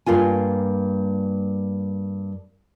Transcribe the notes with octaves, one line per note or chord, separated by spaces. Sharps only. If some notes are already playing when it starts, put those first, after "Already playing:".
G2 A#3 F4 G#5